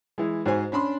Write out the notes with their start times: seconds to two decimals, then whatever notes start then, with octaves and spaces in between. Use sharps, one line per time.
0.18 E3 G#3
0.46 G#2 F#4 C5 G#5
0.72 C#4 D4 B5 C6